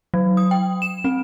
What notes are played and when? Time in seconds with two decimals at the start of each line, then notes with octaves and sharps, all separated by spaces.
0.14 F#3
0.37 D#6
0.51 G5
0.82 E7
1.04 C4